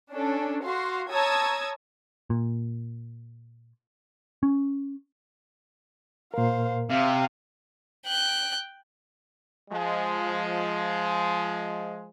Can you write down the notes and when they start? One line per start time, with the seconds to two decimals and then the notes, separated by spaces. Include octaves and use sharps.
0.12 C#4 D4 A4
0.63 F#4 F5 C6
1.12 C#5 A5 A#5 D#6 E6 G#6
2.30 A#2
4.43 C#4
6.34 A#2 A#4 C5 F5
6.90 C3 F5
8.06 G5 F#6
9.70 F3 G#3